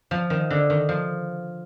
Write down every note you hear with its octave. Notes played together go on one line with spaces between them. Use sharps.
F3
D#3
D3
D#3
F3